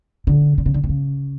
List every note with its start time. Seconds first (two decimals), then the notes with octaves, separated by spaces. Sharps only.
0.27 D3
0.58 D3
0.66 C#3
0.74 D3
0.84 C3
0.89 C#3